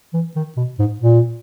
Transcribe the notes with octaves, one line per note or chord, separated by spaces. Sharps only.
E3
D#3
B2
G#2
A#2